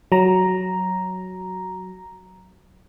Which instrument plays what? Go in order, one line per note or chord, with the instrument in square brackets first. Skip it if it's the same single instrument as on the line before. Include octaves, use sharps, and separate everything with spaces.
[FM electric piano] F#3 A#5